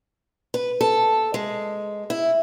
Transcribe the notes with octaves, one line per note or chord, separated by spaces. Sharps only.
B4
A4
G#3
E4